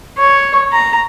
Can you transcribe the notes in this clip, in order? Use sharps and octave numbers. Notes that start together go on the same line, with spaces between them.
C#5
A#5